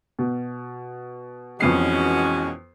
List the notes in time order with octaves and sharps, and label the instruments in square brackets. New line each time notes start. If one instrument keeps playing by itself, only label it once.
[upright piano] B2
[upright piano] F2 B3 C7 [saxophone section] B2 G#3 C#4 [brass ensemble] E3 F#4